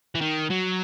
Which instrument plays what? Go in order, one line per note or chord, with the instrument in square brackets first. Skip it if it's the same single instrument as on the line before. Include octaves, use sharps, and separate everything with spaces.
[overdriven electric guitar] E3
D#3
F#3